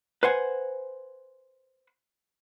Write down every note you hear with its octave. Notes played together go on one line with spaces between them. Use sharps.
B4 C5 F#5 G#5